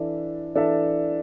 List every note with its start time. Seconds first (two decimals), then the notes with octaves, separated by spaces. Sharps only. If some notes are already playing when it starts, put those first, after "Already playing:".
Already playing: E3 D4 A4 E5
0.55 E3 D4 A4 E5